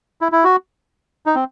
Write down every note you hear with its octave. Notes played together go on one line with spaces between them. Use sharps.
E4
E4
F#4
D#4
C4